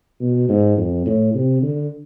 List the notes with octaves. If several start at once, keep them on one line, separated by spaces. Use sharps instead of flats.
B2
G#2
F2
A2
C3
D3